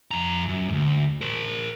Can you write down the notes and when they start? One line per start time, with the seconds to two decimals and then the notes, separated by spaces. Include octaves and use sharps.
0.11 F2 A#5
0.49 F#2
0.68 D2 G#2
1.21 A#4 C5